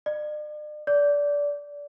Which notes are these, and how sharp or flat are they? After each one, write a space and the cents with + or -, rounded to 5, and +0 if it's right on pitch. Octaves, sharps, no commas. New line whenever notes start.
D5 +40
D5 -20